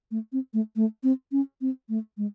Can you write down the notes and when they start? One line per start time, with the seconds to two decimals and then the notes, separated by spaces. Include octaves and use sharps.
0.11 A3
0.33 C4
0.54 A3
0.76 A3
1.03 C4
1.32 C#4
1.61 C4
1.89 A3
2.17 G#3